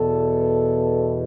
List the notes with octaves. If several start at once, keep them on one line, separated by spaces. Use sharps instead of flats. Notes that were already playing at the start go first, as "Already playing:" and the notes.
Already playing: E2 B2 A4